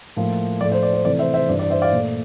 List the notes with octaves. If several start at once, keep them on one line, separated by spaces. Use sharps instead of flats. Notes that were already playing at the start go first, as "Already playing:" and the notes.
A2 F3 A#3
A2 F3 A3 D5
C5
D5
C5
C3 E3 A3 D5
C5 E5
C5 E5
G2 E3 G3 D5
D5
C5 E5
D5 F5
A#2 A3